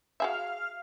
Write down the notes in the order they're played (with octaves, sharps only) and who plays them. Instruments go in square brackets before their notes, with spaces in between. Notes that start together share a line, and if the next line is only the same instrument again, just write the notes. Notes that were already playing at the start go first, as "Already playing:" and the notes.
[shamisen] F#4 G#4 E5 [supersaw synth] F5 F6